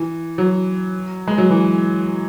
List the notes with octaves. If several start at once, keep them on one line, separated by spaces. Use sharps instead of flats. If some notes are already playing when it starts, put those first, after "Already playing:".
Already playing: E3
F#3
G#3
F#3
E3